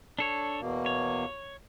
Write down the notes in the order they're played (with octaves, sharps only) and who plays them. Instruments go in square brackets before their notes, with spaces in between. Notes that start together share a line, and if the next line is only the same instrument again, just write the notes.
[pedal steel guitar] D4 A4 C#5
[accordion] E2 B2 A#3
[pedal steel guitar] C#5